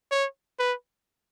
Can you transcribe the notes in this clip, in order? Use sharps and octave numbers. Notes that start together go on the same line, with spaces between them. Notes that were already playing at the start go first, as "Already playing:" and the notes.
C#5
B4